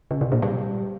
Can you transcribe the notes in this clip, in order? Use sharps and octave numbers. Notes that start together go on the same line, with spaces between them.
C#3
C3
A#2
G3